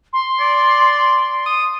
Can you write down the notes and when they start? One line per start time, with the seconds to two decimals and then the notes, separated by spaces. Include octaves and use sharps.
0.12 C6
0.40 D5
1.46 D#6